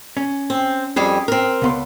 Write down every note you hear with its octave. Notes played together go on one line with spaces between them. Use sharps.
C#4
C4
F2 G3 G#4
C4 A#4
C#2 B3 C6